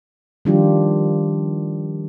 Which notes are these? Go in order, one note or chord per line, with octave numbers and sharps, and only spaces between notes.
D#3 F3 G3 D4 F4 G4